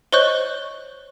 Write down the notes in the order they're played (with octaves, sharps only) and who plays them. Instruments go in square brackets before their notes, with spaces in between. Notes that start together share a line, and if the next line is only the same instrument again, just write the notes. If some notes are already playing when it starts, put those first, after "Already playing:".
[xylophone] C5 C#5 D#5 C#6 F#6 G6